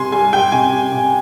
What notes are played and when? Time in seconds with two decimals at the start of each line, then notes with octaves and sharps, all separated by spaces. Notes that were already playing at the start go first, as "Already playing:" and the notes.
Already playing: C3 G3 G#5 C6
0.12 G3 G#5
0.33 G3 G5
0.52 C3 G#5
0.72 C3
0.92 C3